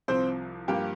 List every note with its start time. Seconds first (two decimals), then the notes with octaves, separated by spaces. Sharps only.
0.08 C2 C3 F3 C4 C5
0.68 G2 F3 A#3 G4